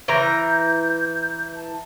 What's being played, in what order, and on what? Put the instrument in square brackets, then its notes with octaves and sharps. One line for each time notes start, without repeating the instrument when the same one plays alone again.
[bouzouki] E3 A#5 [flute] G6
[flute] A5